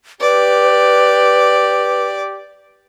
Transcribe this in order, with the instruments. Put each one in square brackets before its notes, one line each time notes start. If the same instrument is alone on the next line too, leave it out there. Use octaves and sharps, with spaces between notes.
[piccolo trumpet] G4 [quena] B4 [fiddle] D5